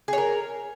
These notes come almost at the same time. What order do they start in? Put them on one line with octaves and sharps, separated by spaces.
G#4 C#5 A#4